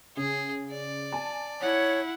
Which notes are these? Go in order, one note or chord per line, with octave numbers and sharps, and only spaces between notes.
C#3 G#4
D5
G#5 A5
E4 C#5 F#5